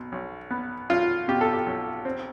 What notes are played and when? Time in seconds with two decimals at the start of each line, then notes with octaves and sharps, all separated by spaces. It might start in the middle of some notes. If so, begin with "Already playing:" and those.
Already playing: B1 B2
0.12 B1
0.51 B3
0.89 B1 F4
1.28 B2 G4
1.41 A4
1.53 G4
1.66 B1
2.05 C4